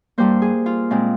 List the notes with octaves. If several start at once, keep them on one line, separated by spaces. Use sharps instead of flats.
G2 G3 A#3 C5
G#4
F4
A#2 G#3 C4